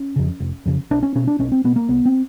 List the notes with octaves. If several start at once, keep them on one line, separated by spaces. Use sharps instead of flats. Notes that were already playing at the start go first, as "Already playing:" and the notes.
Already playing: C#4
F2 C#3
F1
F2 C#3
B1 D4
C#4
B2 C#4
D4
B1 C#4
C4
B2 B3
A#3
C2 B3
C4